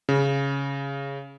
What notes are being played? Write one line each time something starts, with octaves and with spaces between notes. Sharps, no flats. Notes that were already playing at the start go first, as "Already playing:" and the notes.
C#3